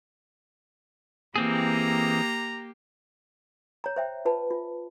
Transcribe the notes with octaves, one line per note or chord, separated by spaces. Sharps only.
E3 A#3 C4 G4 G#4 A#5
C#5 A#5
C5 E5 G5
F4 B4 A5
F4